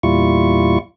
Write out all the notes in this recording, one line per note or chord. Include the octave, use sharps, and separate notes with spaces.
E2 A#2 G3 E4 F4 C#6